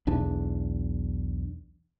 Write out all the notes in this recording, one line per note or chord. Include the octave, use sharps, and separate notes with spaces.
B1 E2 D4